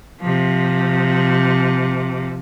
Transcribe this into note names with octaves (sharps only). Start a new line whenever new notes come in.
C3 F3